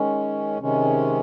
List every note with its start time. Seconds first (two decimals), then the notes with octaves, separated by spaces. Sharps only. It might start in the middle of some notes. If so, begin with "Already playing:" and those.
Already playing: D#3 G#3 C#4
0.61 C3 D#3 G#3 C#4